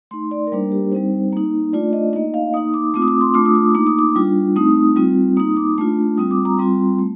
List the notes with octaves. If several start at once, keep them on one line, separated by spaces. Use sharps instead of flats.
A3 D#4 C6
D5
A#4
G3 A#3 D4 C5
G4
G3 C4 D#4 C5
A#3 D#4
A3 D4 F4 D5
D#5
A#3 D#4 D#5
F5
A#3 D#4 D#6
D6
A3 C4 F4 D6
D#6
D6
C6
A3 D4 F4 D6
D#6
D6
A#3 D#4 D6
D#6
D6
G3 D4 F4
A3 C4 D#4 D#6
G3 C4 F4
A#3 D#4 D#6
D6
A3 D4 F4
G3 C4 F4 D#6
D6
A#5
G3 C4 F4 C6
A3